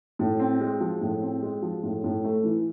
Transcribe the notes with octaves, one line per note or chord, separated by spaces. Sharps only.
A2
C4
G#3
F3
A2
C4
G#3
F3
A2
A2
A3
E3